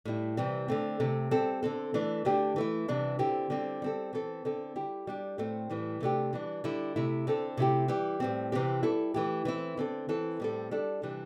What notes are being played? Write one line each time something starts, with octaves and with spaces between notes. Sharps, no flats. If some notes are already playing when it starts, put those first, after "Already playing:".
A2 G3 E4
C3 E3 G3 C4
D3 A3 C4
C3 A3 C4
G3 C4 A4
D3 C4 A4
E3 A3 D4
D3 A3 D4 G4
E3 A3 E4
C3 E3 G3 D4
D3 C4 E4 G4
D3 G3 C4
G3 C4 A4
E3 C4 A4
D3 C4 A4
G3 E4 G4
G3 D4 G4
A2 A3 C4
A2 E3 G3
C3 A3 D4 G4
E3 G3 D4
D3 G3 E4
C3 A3 E4
D3 C4 A4
C3 A3 E4 G4
E3 G3 E4 G4
A2 G3 C4
C3 E3 C4 G4
G3 E4 A4
E3 A3 E4 G4
E3 C4 E4
D3 C4 A4
E3 C4 E4 A4
A2 G3 C4 A4
G3 D4 A4
C3 E3 G3 D4